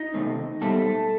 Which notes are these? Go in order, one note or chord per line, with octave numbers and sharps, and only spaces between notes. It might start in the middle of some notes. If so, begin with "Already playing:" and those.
Already playing: D#4 D#5
C3 D#3 A3 C4
B2 G3 A3 C4 A4